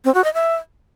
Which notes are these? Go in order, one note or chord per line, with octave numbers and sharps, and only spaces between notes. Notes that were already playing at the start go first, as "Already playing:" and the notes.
C4
F#4
D#5
E5